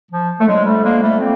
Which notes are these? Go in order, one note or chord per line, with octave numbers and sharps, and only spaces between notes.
F3
A3
F2 D3 F#3 G#3
G3 A3
G#3 A#3
G3 A3
A#3 C4